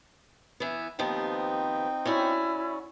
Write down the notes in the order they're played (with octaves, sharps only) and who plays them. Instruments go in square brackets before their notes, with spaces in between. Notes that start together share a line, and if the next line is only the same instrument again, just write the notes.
[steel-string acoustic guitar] E3 B3
[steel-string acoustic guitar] D#2 F3 B3 [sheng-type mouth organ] C4 D#4 G5
[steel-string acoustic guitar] C#4 F#4 D5 [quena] E4